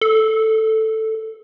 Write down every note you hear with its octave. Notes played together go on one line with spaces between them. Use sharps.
A4